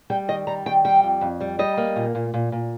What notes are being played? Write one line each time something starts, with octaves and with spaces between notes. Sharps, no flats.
G3 G5
D#3 D#5
G3 A#5
D#3 G5
G3 G5
F2
F2
G3
G3 D#5
A#3
A#2
A#2
A#2
A#2